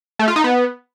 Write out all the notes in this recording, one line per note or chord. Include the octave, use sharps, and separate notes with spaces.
A3
F4
D#4
B3